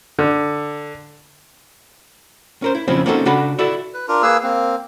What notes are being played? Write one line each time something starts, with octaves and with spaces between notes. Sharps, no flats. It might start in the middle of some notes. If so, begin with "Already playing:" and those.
D3
C#4 A#4 C5
E4
F2 C#3 F3 C4 C#4 E4
A#3 C4 C#4 D#4 F#4 A4
C#3 D4 F#4 A4 B5
E4 F#4 A4 D5 E5
B4
D4 F4 A#4
A#3 G#4 B4 E6
A#3 C4